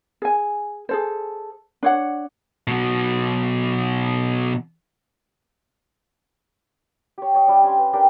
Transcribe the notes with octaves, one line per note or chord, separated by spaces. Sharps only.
G#4 G#5
G#4 A4 C5
D4 C#5 F#5
B2 F#3
G4 C#5
C#5 D#5
G3 D4
C#4 F5 G#5 C6
B4
D4 G4 A#4 G5